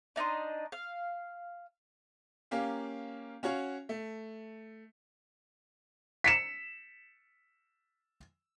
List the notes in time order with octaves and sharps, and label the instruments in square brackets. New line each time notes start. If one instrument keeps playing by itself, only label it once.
[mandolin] D4 D#4 D#5 C6
F5
[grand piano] A#3 C#4 G4 F5
C#4 F#4 C#5 F5
A3
[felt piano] B6 C#7 E7